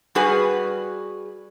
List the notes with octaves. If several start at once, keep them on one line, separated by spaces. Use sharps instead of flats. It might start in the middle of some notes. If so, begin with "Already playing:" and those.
G3 F#4 G#4 B4